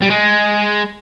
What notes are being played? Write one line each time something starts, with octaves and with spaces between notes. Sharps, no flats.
G3
G#3